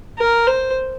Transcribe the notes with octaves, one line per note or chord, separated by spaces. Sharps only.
A#4
C5